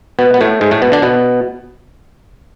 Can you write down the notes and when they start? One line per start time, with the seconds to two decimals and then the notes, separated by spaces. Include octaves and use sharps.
0.19 B2 B3
0.34 B3
0.41 A2 A3
0.61 G#2 G#3
0.71 A2 A3
0.82 B2 B3
0.92 D3 D4
1.02 B2 B3